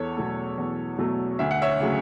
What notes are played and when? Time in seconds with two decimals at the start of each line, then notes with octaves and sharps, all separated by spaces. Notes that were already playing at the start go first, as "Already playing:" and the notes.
Already playing: E2 A4 C#5
0.17 B2 F#3 A3
0.58 E2
0.98 B2 F#3 A3
1.39 D2 E5
1.51 F#5
1.62 C#5 E5
1.80 C#3 F#3 A3